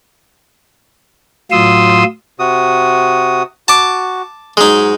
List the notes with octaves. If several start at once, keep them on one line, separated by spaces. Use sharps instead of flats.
A2 F#3 F4 C6 D#6 E6
C3 F#4 D#6
F#4 A5 D6
G#2 F#3 G#3 D#4